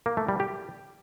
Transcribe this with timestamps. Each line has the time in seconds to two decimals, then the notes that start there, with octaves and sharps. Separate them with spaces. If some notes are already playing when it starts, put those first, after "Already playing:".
0.06 A#3
0.17 A3
0.29 G3
0.40 G4